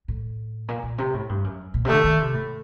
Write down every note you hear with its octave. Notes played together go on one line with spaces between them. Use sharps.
A2
A#2
A#2
C3
A2
G2
F#2
A#2
C3
D3 A3
D#3
C3
A2